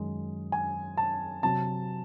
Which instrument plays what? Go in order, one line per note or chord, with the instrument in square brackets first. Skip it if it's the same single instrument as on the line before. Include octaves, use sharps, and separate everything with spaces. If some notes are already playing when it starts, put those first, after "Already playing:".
Already playing: [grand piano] F#2 D#3 G#3
G#5
A5
C3 F#3 A5